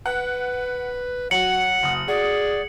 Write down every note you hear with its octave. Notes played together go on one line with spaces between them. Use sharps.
B4 F#5 F#6
F#3 F#5 C#7 F#7
F#1 D#6
F#4 G#4 D5